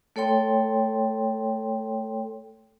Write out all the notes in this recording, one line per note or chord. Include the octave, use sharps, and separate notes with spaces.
A3 A4 C#5 G5 C6